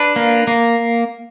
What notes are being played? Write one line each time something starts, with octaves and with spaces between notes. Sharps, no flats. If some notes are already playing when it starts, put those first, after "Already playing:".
Already playing: D4 B4
A#3
A#3